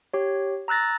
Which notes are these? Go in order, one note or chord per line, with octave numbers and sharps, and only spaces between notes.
G4 C#5
A#5 E6 F#6 A6 A#6